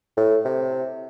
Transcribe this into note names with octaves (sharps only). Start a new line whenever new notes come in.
A2
C3